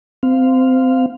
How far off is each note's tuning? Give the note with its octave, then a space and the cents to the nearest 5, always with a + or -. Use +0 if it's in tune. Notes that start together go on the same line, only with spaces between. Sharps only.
C4 -20 F5 +0